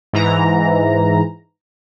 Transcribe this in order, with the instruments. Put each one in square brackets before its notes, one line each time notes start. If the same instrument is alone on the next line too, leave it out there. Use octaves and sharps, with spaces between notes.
[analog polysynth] G#2 E3 A#5